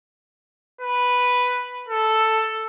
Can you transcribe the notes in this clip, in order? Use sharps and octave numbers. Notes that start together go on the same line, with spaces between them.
B4
A4